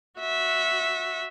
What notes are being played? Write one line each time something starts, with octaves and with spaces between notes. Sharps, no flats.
F#4 E5